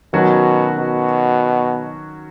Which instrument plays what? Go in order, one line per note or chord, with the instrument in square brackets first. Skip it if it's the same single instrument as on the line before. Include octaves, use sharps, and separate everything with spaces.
[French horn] B2 [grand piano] D#3 F#3 C#4 F#4
[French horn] B2